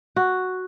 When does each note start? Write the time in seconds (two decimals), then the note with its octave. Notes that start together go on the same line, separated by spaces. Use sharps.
0.16 F#4